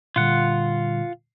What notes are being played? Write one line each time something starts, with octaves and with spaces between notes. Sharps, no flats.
A#2 D3 G3 F4 F#5